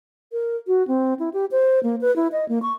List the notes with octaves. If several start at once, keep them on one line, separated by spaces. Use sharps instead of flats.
A#4
F#4
C4
E4
G4
C5
A#3
B4
E4
D#5
A#3
C#6